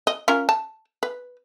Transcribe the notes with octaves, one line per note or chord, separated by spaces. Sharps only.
D#5
C#4 F4 A#4
A5
B4